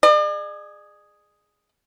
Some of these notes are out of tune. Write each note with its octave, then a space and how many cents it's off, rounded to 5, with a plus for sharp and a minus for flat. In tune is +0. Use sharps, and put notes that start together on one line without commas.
G#4 +0 D5 +45